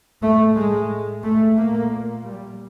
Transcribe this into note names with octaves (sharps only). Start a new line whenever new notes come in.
A2 A3
G#3
A3
A#2 A#3
G3